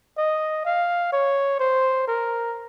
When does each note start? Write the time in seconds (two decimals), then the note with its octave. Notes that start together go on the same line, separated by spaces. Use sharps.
0.17 D#5
0.65 F5
1.12 C#5
1.60 C5
2.07 A#4